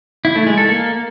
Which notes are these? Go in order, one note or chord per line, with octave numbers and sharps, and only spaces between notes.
E4
A3
G#3
A4
A#3